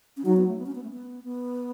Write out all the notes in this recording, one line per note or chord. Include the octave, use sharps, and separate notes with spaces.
C#4
F#3 D#4
B3
A3
B3
C#4
B3
A3
B3
B3